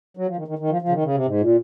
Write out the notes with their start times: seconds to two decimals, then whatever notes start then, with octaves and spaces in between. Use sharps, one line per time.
0.17 F#3
0.27 F3
0.36 D#3
0.48 D#3
0.58 D#3
0.70 F3
0.82 F3
0.88 C#3
0.92 D#3
1.04 C#3
1.15 C3
1.26 G#2
1.41 A#2